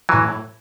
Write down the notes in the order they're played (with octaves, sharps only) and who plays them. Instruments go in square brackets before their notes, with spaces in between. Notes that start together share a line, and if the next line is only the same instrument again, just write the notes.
[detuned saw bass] A2 [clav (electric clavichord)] E3 F#3